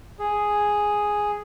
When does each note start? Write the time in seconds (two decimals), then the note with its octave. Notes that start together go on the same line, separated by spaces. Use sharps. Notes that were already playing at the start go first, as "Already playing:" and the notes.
0.19 G#4